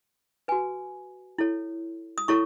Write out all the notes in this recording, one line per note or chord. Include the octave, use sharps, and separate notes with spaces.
F#4 B4 G#5
E4 A4 C#5
D#6
E4 A4 C#5 C#6